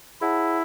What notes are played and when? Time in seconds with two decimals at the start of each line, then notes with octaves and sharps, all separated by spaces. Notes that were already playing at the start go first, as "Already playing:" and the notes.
0.21 E4 G#4 C#5 F#5 A5